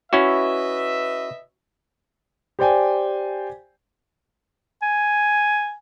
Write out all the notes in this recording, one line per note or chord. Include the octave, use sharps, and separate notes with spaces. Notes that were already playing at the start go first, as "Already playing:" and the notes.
C#4 E4 F#4 B4 D#5 E5
G4 C5 D5 G5 G#5
G#5